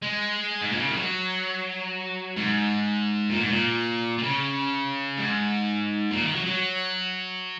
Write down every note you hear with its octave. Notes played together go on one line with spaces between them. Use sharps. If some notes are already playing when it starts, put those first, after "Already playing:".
G#3
G#2
A#2
C#3
D#3
F#3
G#2
A#2
G#2
A#2
A#2
C#3
G#2
A#2
D#3
F#3
F#3